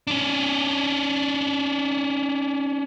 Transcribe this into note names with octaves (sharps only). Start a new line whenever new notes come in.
C#4 D4